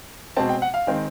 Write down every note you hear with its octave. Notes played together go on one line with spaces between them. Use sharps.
B2 G#3 C4 A5
G5
F#5
F5
D#3 G#3 C4